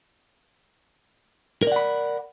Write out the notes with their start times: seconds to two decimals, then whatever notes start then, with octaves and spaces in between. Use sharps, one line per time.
1.63 A#4
1.67 D5
1.72 F#5
1.76 B5